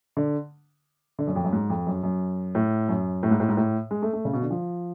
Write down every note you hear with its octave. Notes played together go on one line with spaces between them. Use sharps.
D3
D3
F#2
F2
F#2
G#2
F2
F#2
F#2
A2
F#2
A2
G#2
A2
G#2
A2
G#3
A3
A3
C#3
B2
D3
F3